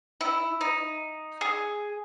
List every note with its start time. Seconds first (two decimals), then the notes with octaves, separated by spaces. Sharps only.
0.21 E4
0.61 D#4
1.41 G#4